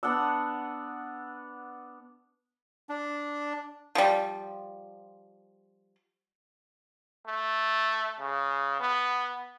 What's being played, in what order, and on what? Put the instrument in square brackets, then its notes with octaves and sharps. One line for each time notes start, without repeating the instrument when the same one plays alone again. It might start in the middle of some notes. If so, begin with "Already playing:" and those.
[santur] B3 D4 F#5 E6
[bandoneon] D4
[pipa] F3 G3
[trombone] A3
C#3
B3